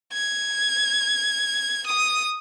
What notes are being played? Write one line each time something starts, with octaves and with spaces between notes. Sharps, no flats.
G#6
D#6